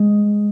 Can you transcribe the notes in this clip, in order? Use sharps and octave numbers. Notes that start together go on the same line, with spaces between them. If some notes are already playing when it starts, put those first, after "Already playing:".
Already playing: G#3